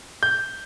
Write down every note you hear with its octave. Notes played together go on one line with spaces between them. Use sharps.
G6